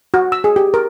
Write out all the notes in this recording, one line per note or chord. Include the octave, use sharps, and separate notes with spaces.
F#4
E6
G#4
G4
A#4